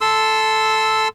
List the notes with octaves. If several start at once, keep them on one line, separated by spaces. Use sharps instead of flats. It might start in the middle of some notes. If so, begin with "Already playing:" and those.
A4 C6 E6